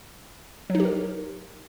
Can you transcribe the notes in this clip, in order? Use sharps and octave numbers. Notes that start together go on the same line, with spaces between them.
F#3
D#4
G4
A#4